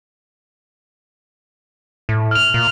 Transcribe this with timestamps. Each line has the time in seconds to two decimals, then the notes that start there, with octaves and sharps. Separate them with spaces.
2.09 A2
2.31 F6 F7
2.54 A#2